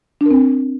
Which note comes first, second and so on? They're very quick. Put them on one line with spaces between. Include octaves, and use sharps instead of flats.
D4 A#4 C4